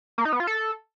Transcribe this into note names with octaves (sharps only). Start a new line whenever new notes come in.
A#3
D#4
B3
F4
A4